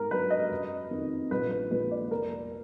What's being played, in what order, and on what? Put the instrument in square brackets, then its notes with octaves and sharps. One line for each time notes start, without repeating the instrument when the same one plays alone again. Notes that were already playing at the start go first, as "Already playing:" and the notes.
Already playing: [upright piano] G#2 A#4
F#3 D4 B4
D#5
F#1
F2 D#3
A#1 B4
B4
A#2 F3 G#3 B4
D5
F1 A#4